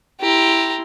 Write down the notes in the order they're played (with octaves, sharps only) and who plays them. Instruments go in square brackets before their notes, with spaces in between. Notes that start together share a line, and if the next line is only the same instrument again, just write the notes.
[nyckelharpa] E4 C6 [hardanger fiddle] G4 A#5